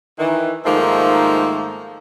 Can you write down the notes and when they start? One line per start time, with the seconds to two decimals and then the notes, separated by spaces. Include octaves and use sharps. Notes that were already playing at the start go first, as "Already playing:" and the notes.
0.19 D#3 E3
0.64 G#2 D#3 F3 A3 A#3